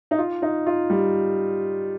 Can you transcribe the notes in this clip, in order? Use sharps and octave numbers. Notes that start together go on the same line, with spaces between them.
D#4
F4
D#4
F4
G3